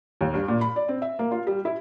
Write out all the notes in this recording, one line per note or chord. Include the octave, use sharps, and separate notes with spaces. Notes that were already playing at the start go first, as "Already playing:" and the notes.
D#2
G2
A#2
B5
D5
C4
E5
A#3
F4
G3
E4